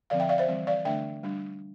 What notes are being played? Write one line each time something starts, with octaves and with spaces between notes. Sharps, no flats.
D3 F3 C4 D5 F5
E5 G5
D5 F5
C5 E5
E3 G3 C4
D5 F5
D3 A3 D4 E5 G5
G3 D4